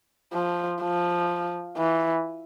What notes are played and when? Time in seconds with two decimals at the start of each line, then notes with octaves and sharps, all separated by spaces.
0.34 F3
0.82 F3
1.77 E3